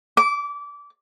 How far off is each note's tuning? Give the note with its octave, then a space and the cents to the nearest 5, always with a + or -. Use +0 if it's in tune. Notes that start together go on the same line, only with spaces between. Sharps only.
D6 -25